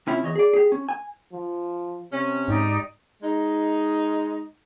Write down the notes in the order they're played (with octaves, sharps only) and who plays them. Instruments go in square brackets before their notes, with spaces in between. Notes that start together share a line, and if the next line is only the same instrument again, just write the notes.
[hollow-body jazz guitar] C3 C#4 E4 F4
E2 C#5 D#5
G#4 D5
G4 G#4
C#4
G#5
[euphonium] F3
[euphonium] C3 [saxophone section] C#4
[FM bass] G#2 [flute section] D#4 G4 D5
[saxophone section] G#3 D#4